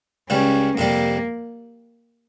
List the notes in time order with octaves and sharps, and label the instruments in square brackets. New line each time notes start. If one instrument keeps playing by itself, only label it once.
[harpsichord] C#2 C#3 G3 [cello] C#4
[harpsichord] F2 C3 G3 [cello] A#3